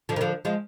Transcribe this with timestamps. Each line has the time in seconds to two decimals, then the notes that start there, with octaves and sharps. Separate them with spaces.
0.09 D3 F3
0.16 D#3
0.21 D3 F3
0.45 F3 G#3